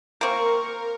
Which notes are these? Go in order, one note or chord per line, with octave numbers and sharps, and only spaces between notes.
A#3 C4 A#4 C#6